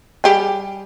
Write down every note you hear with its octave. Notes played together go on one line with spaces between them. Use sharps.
G3 G4 G#4